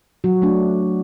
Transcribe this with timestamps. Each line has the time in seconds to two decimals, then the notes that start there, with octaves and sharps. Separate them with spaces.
0.24 F#3 F#4
0.42 A3 D4